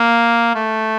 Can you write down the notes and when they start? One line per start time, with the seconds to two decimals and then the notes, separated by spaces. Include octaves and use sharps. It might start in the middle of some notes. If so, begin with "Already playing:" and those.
Already playing: A#3
0.55 A3